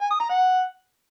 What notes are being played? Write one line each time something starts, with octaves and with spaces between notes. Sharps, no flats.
G#5
D#6
A#5
F#5